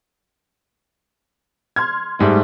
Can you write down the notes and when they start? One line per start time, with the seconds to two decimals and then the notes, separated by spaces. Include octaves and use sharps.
1.76 C6 F6 G#6
2.20 G#2 G3 A3